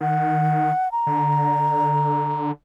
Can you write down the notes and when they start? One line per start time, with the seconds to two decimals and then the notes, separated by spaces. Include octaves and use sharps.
0.01 D#3 F#5
0.92 A#5
1.07 D3